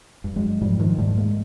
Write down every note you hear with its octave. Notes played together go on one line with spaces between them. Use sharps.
G2
F#3 G#3
G#2 F3 G3
D#3 F3
G#2 G3 A3
G#3 A#3